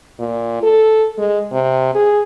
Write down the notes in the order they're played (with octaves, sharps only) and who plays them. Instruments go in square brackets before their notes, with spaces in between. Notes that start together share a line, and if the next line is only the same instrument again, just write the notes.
[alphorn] A#2
A4
G#3
C3
G#4